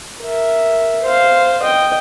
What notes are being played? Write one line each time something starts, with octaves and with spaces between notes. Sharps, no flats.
A#4 E5
C5 F5
D#5 G5